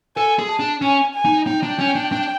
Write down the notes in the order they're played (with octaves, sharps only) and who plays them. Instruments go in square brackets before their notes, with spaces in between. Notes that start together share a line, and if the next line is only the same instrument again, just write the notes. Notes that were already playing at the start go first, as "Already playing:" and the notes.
[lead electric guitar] A4 [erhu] G#5
[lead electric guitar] G#4
[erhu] A5
[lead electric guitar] D4
[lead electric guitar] C#4 [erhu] G#5
[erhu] G#5
[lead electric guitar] D#4
[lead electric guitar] D#4 [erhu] G5
[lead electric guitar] D4
C#4
D4
D4